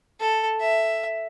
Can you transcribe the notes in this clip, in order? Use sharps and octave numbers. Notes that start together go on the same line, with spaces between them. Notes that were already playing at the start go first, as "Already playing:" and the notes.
A4
E5